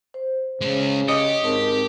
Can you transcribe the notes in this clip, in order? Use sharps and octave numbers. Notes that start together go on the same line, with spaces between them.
C5
C#3 G#3 C#4
G4 C#5 D#5
G#2 C4 A#4 A5